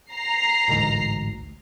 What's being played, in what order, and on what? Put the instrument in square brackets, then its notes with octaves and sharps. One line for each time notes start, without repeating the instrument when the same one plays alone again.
[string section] A#5 C7
[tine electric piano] A1 D2 G#2